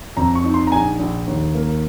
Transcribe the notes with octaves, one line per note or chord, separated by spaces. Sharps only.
F2 A#5
C#6
D#4
C6
A#5
A#1 G#5
A#1
D#2
A#3